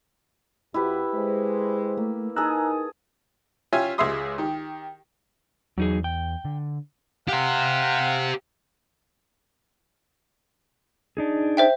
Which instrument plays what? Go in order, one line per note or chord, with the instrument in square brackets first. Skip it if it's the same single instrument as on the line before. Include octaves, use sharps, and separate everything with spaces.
[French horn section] F2 F#4 [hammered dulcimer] E4 G4 B4
[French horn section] G#3 C5
[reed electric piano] A3 [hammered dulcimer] A#3
[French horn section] D#4 A#4 [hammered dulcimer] G#4 A5 [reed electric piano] A#5 E6 F#6
[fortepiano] C#4 F4 G4 E5 G#5
C#2 G#3 G#4 E5 C6 D#6
D#3 G4
[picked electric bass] E2 [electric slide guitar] F#3 D#4 G#4
[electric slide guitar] G5
[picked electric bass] D3
[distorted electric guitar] G4 C5 [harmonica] F5 F#5
[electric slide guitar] D4 D#4 G#4
[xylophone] C5 E5 G5